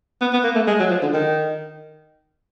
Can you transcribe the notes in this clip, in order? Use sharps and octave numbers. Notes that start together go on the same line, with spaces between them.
B3
B3
A#3
A3
G#3
F#3
F3
D3
D#3